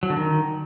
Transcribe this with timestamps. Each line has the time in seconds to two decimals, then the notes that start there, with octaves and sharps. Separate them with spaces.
0.03 F#3
0.10 D3
0.17 D#3